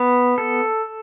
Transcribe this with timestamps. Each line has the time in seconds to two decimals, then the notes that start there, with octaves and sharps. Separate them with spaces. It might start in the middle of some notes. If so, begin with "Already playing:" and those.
Already playing: B3
0.38 A4